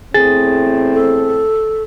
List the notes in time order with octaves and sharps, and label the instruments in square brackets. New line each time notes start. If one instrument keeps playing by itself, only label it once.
[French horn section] E2 A2 C4 [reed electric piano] G#4 A6
[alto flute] A4